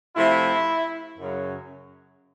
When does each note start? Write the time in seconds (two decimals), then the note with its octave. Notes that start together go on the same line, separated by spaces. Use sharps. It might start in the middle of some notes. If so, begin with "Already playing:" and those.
0.16 C3 F3 A3 E4
1.18 F#2 C#3 F#3